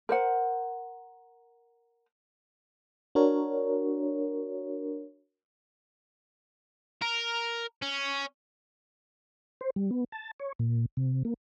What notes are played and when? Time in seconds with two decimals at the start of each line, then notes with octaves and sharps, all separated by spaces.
0.09 A#4 C5 F#5
3.15 D4 F#4 A#4 C#5
7.02 A#4
7.82 C#4
9.61 C5
9.76 G3
9.91 B3
10.12 A5
10.40 C#5
10.59 A#2
10.97 C3
11.25 A#3